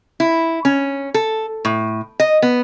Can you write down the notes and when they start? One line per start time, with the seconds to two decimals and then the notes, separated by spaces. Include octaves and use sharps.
0.20 E4
0.65 C#4
1.14 A4
1.65 A2
2.20 D#5
2.42 B3